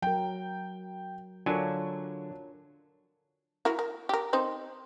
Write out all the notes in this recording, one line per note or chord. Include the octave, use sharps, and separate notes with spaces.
F#3 A#4 G5
D3 F#3 D4 F4 A#4 C#5 G#5
E4 F#4 A#4
A#4
G4 A#4
C4 D#4 C5